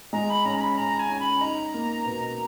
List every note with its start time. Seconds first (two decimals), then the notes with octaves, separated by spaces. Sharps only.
0.13 G#3 A#5
0.30 B5
0.45 C#4 A#5
0.56 A#5
0.61 B5
0.78 C#4 A#5
0.99 G#5
1.09 C#4
1.20 B5
1.41 D#4 A#5
1.74 A#3
2.05 B2